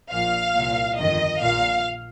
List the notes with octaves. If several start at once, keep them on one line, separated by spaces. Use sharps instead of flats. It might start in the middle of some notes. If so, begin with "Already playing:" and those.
A#1 A#2 F5
C2 A#2
G1 F2 D#3 D#5
A#1 A#2 F5